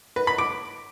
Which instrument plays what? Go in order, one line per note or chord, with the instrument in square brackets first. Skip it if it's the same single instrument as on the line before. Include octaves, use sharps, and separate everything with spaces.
[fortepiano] B4
B5
D6